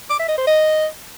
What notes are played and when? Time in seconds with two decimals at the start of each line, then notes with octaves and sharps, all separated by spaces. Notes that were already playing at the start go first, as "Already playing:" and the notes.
0.10 D6
0.19 E5
0.28 D#5
0.38 C5
0.47 D#5